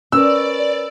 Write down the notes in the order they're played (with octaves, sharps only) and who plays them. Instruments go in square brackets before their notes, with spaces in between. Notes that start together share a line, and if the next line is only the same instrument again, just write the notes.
[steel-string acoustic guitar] C#4 A#4 B4 [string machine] D5 [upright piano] E6